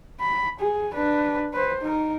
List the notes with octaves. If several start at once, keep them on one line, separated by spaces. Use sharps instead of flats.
B5
G#4
D4 B4
B4 C5
D#4 A#4